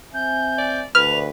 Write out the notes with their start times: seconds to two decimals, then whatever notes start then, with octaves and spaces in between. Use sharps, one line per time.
0.14 C4 E5 G#5 G6
0.58 D5
0.95 D2 B4 F6 F7